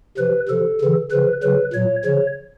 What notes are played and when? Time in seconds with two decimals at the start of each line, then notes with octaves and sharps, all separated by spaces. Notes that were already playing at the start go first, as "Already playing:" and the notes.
0.18 C3 F3 B4
0.48 C3 F3 A4
0.81 C#3 E3
1.11 C#3 F3 B4
1.43 C#3 F#3 B4
1.73 A#2 F#3 C#5
2.05 C#3 F3 C#5